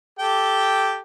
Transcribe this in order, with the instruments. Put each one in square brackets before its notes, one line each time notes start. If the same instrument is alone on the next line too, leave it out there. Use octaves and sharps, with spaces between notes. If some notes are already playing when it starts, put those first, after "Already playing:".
[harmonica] G4 A4 G5